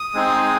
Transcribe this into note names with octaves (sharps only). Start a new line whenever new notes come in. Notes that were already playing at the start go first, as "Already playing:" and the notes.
Already playing: D#6
G#3 C4 D#4 G#4